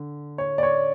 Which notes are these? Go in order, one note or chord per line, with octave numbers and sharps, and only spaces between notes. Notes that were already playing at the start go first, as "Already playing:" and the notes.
Already playing: D3
C#5
D5
C#5